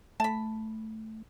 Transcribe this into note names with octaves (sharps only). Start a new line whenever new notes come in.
A3 A5 B5